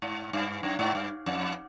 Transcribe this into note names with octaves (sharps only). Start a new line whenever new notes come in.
G#2
G2
F#2
G#2
G2
F2